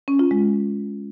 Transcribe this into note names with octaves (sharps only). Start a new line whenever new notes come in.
C#4
F4
G#3